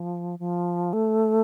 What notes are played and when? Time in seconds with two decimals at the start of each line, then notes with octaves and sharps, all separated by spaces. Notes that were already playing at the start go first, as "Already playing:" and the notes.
Already playing: F3
0.39 F3
0.93 A3